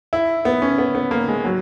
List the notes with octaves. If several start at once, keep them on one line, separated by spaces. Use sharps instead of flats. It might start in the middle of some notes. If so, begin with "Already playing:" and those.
E4
B3
C#4
B3
B3
A#3
G#3
F#3